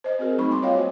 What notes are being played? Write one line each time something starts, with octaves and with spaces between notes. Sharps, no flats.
C5 D#5
C4 F#4 G#4 A#4
F#3 A3 C4 D#4 B5 C#6
G3 A#3 C6 D6
F4 C#5 D#5 F5 G5
F#4 C5 G#5